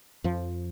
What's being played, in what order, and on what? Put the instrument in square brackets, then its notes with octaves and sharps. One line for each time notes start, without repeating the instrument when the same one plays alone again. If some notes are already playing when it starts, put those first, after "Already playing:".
[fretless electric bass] F2 F3